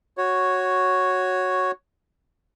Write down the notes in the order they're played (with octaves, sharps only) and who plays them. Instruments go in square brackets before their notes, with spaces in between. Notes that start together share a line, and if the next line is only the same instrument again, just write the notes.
[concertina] F#4 C#5